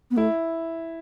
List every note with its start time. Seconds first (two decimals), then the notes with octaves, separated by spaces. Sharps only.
0.11 B3
0.17 A3 E4